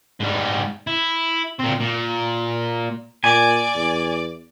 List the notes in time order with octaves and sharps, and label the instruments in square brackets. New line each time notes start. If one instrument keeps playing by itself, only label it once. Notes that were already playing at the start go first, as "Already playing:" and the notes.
[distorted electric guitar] G#2 G3
E4
A#2 C4
A#2
[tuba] A#2 [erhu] D5 [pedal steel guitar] G#5
[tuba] E2